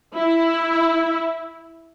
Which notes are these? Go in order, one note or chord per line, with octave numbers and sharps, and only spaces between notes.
E4